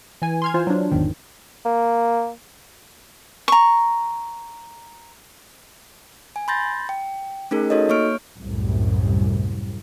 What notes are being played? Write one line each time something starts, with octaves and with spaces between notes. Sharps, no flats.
E3 G#5
C6 F6 G#6
E3 F4 C5
F#3 D4
G1 E2 G#2 D#3
A#3
A#5 C#6
G#5
B5 C6 G6 A6 A#6
G5
A3 C#4 D#4 G#4 A#4
D#4 F#4 A4 C#5 D#5
A#3 C#5 C#6 F6 D7
C2 F#2 A2